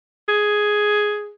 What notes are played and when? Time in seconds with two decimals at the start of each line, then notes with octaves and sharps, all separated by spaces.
0.29 G#4